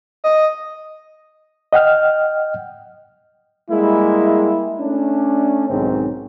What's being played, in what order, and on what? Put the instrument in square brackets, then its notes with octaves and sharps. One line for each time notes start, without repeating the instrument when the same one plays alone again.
[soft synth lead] D#5
[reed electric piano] D#5 F#5 G5 F6
[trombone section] G3 G#3 A#3 E4
A3 C#4 D4
B1 G#2 D#3 C4 C#4